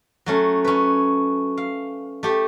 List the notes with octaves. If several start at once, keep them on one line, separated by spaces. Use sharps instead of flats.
F#3 A3 C#4
C#4 B4
F5
A3 G4